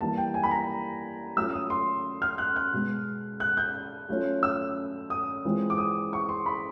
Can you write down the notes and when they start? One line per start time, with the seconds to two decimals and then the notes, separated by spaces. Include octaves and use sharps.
0.01 E3 G3 A#3 A5
0.17 G5
0.34 G#5
0.43 B5
0.51 A#5
1.37 F#3 A3 C#4 F4 E6
1.53 D#6
1.70 C6
2.22 F6
2.38 F#6
2.56 F#6
2.73 B2 G#3 B3
3.40 F#6
3.57 G6
4.08 F#3 A3 C#4 F4
4.43 E6
5.10 D#6
5.45 E3 G#3 C4 F4
5.70 D6
5.78 D#6
6.13 C#6
6.29 C6
6.46 B5